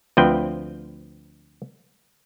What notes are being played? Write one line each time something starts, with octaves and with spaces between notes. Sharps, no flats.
D2 F3 C4 B4 G5